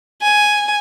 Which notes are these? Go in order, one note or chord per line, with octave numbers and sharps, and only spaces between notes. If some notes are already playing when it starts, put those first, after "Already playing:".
G#5